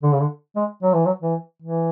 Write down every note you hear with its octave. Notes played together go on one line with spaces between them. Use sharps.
D3
C#3
D3
G#3
F#3
E3
F#3
E3
E3